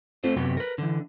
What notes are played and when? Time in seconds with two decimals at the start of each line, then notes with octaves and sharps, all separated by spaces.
0.24 A3 C4 F4 C5
0.36 F#2 C3 F#3 B3 G4
0.57 A#4 B4
0.78 D3 E3